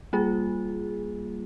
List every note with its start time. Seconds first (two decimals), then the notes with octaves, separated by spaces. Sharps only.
0.13 G3 A#3 F4 G#4